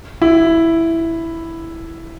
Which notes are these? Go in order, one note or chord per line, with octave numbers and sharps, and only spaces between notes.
E4